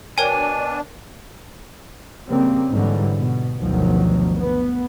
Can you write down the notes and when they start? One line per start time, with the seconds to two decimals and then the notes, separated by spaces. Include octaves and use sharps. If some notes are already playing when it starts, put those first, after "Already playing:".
0.18 B2 D4 A#4 C#5 G5 G#5
2.27 C#3 G3 A#3 C4
2.70 G#2 D3 E3 F#3 G3
3.16 B2
3.57 G1 D2 B2 D#3 F3 F#3
4.37 B3